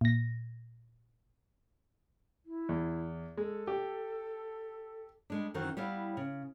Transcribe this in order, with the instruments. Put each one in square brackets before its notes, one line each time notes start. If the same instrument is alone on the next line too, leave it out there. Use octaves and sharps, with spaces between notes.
[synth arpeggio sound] A#2 A#6
[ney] E4
[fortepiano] E2
[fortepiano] G#3 [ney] A4
[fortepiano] G4
[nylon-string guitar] G3 G#3 D4
F#2 D#3 E3 C4 F#4
G3 B3 E4 F5
C#3